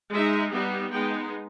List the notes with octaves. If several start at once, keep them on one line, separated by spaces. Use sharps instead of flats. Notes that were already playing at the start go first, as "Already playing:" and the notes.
G#3 D#4 E5
G3 B3 D#4
G#3 B3 D#4 G5